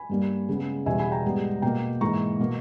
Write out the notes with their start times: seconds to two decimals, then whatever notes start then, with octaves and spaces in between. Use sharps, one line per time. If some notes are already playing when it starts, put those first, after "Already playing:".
Already playing: G#5 B5
0.09 G2 G3 A#3
0.49 C#3 G#3 B3
0.86 E2 B2 G3 E5 G#5
0.99 G#5 B5
1.12 G5 A#5
1.25 G#2 G3 B3
1.62 B2 A#3 G5 A#5
2.01 G#2 E3 A#3 A#5 C#6
2.40 B2 A#3